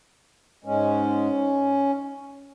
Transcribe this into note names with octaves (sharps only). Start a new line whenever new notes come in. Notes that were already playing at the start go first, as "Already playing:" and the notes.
G#2 G#3 C#4